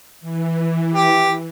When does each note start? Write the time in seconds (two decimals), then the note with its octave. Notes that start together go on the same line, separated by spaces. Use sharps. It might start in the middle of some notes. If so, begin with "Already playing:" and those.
0.21 E3
0.95 G4